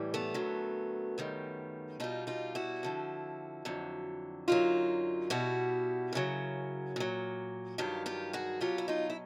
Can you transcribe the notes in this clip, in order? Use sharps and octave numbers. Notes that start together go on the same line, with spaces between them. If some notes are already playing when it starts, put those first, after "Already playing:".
Already playing: A2 E3 G3
A3 B3
F#2 D3 F#3
F#2 D#3 G3
B2 G3 D#4 F4
D#4 F4
E4 F#4
F2 D3 F3
F2 D3 F#3
F#2 D3 F#3 D#4 F4
B2 G3 E4 F#4
F#2 C#3 F#3
A#2 F#3
G2 D#3 F#3 F4 G4
F4 G4
F#4 G#4
B2 F#3 F4 G4
E4
D#4 F4
E4